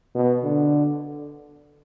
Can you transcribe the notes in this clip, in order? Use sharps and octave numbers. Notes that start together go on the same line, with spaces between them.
B2
D3